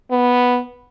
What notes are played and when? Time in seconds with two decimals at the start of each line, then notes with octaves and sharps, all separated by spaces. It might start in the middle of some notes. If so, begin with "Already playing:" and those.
0.11 B3